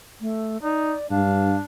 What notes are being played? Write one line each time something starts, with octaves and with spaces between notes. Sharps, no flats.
A3
D#4 D5
G2 D4 F5